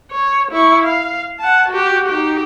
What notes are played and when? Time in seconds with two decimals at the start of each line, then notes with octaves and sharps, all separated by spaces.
0.11 C#5
0.52 E4 C#6
0.84 F5
1.39 F#5 A5
1.69 F#4 G4
2.08 D#4 G4